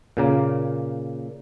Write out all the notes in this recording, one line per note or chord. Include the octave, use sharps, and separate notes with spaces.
A#2 C#3 A#3